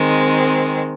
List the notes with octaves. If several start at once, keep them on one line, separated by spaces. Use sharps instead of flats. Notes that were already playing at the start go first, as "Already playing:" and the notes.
Already playing: D#3 G#3 C4